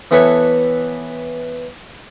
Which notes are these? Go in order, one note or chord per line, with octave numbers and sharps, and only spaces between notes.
E3 B3 A4 C#5 E5